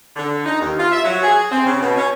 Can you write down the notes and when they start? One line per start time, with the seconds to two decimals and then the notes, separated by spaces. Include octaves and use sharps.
0.16 D3
0.46 D#4
0.61 D#2
0.79 F4
0.92 E5
1.04 F#3
1.22 G#4
1.51 C4
1.65 C#3
1.80 B2
1.97 C#4